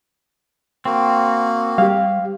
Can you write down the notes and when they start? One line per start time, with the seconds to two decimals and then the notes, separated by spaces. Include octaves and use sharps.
0.85 A#3 C4 F#4
1.78 G3 G4 F5